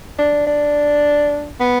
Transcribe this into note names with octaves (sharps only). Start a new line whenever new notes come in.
D4
D4
B3